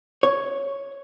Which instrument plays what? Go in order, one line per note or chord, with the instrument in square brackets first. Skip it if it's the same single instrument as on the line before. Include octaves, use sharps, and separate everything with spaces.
[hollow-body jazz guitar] C#5